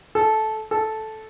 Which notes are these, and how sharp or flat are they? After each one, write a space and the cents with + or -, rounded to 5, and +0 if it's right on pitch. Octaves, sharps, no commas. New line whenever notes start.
A4 -15
A4 -10